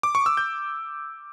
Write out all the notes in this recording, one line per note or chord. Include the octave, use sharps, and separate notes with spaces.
D6
C#6
E6
G6